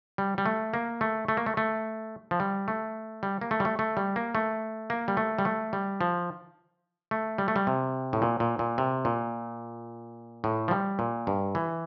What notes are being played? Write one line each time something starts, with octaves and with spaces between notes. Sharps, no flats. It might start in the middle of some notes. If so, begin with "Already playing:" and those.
G3
G3
A3
A#3
A3
A3
A#3
A3
A3
F3
G3
A3
G3
A#3
A3
G3
A3
A3
G3
A#3
A3
A#3
G3
A3
G3
A3
G3
F3
A3
G3
A3
G3
C3
A2
A#2
A#2
A#2
C3
A#2
A2
F3
G3
A#2
G2
E3